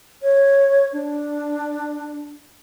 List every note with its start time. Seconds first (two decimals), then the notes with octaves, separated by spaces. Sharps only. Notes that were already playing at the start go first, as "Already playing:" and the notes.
0.22 C#5
0.93 D4